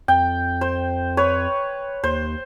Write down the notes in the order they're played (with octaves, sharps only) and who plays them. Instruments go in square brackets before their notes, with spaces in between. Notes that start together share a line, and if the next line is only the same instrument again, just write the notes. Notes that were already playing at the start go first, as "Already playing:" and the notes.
[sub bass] F2 [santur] G5
[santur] C5
B4 C#5
[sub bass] D#2 [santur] C5